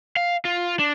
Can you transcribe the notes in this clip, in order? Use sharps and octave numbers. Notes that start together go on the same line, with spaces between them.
F5
F4
D4